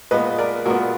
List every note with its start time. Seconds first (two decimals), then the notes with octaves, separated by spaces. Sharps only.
0.11 A#2 G#3 B3 B4 D#5
0.38 A#4 D5
0.65 A#2 G#3 B3 F#4 A#4